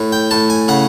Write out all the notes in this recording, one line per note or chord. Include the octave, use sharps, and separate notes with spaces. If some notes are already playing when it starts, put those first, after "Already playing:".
Already playing: A2
G5
A2 A5
G#5
C#3 F#5